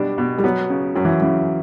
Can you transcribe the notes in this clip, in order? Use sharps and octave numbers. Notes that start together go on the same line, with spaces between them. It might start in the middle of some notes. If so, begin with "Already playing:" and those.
Already playing: B2 G3 D4
B2
G3
F#3 B3
C#3
F#2 F#3
E3
C#3 E3